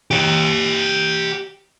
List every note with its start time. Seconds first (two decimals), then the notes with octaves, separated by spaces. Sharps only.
0.11 G4 C#5